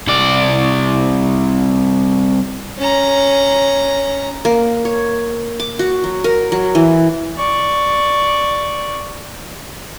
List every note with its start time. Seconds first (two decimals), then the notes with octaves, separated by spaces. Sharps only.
0.07 C2 D5
2.78 C#4 A#5
4.45 A#3
4.85 C#5
5.60 D6
5.79 F#4
6.04 F#3
6.24 A#4
6.52 F#3
6.75 E3
7.37 D5 C#6